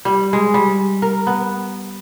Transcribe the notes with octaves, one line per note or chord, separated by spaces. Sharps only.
G3
G#3
G3
A#4
B3